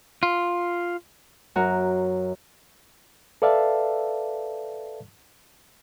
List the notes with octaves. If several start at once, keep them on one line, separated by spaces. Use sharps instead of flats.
F4
F#2 F#4 A#4
A4 B4 D5 E5 F5 A5